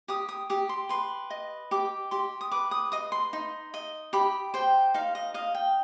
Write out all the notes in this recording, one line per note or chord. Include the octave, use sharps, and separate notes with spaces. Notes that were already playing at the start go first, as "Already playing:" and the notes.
G4 D#6
D#6
G4 D#6
C6
B4 C6
D#5
G4 D6
G4 C6
D#6
B4 D6
D#6
D#5 D#6
C6
D#4
D#5
G4 B5
C5 G5
D#4 F5
D#5
D#5 F5
G5